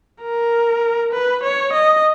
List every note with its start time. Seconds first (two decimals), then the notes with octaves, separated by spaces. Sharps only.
0.23 A#4
1.13 B4
1.43 C#5
1.73 D#5